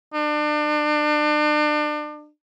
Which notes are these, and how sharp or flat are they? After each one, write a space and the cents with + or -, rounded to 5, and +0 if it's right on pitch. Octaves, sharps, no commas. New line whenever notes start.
D4 +35